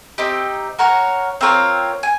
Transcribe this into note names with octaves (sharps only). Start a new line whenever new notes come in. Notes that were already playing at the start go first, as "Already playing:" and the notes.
C4 D#4 G4
F#4 A#4 C#5 F#5
C4 F4 A#4 C#5
G#5